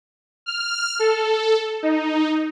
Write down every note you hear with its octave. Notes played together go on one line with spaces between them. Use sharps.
F6
A4
D#4